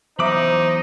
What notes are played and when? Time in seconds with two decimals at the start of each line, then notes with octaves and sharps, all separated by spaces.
0.19 E2 F#3 D#4 C5 E5 B5 D6 D#6